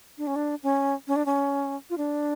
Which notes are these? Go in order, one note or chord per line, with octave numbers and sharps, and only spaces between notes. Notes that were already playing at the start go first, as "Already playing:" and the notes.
D4
C#4
D4
C#4
C#4
D4
C#4
F4
D4